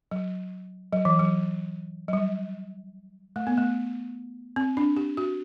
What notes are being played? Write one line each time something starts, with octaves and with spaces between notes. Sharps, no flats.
F#3
F#3
E3
F#3
F#3
G3
A3
B3
A3
C4
D4
G4
F#4